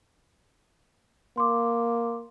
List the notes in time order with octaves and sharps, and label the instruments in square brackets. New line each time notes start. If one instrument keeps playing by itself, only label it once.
[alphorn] A#3 [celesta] C6 D6